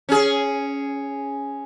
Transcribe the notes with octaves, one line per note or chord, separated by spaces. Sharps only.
C#4 G#4